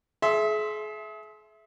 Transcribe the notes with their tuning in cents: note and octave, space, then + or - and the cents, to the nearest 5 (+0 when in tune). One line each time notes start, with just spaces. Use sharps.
G#4 +40 E5 +0 C6 +0